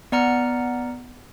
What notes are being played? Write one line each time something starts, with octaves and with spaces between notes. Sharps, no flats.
B3 D5 F#5 A#5 F6 C#7